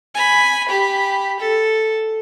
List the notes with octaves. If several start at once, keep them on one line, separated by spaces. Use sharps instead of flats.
G#5 B5
G4 B5
A4